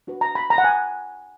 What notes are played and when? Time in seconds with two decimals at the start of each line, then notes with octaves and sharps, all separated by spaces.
0.07 D4 F#4 B4
0.21 A#5
0.35 B5
0.50 A#5
0.58 F#5
0.64 G#5